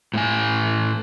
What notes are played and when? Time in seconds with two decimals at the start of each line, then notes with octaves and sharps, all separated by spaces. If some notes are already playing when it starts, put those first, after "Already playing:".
0.14 A2 A3 G#5